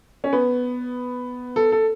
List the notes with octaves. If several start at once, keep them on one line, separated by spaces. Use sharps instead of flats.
C#4
B3
A4
A4